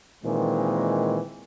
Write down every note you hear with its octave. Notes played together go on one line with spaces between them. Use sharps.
A#2 D#3 E3 G#3 C4